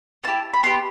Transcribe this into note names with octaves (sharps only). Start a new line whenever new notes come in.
B3 E4 G4 A5
B5
B3 E4 G4 C6